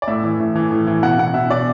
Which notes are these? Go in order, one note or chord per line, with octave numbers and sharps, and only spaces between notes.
D5
A2 E5
E3
A2
E3
A2
E3
B2 F#5
B2 F#5
B2 E5
B2 D5